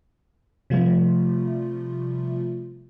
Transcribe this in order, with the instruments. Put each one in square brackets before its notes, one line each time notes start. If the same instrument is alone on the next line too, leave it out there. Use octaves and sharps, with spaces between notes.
[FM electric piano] C3 F3 G3 A3 F4